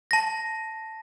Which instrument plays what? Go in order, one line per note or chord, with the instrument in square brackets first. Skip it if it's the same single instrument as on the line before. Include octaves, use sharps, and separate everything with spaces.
[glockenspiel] A5 A#6